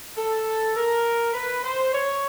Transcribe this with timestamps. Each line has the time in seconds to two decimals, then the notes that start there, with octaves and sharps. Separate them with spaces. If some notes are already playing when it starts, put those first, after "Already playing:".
0.17 A4
0.76 A#4
1.34 B4
1.64 C5
1.93 C#5